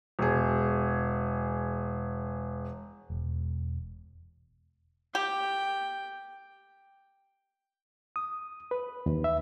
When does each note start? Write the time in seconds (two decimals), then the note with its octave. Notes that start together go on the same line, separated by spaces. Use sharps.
0.19 E1 G#4
3.10 E1
5.15 G4 G5
8.16 D#6
8.71 B4
9.06 D#2
9.24 E5